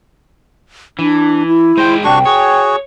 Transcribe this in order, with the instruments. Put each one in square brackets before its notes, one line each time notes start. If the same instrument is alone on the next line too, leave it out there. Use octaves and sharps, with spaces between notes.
[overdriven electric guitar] E3 [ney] D4
[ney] E4
[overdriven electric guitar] G#3 G5 [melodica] C5
[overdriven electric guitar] C2 [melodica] D4 F#4 C#6 [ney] G5
[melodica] F#4 G#4 [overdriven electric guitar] C#5